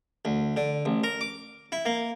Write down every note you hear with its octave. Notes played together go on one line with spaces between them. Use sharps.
D2
D3
A1
A#4
D6
E4
A#3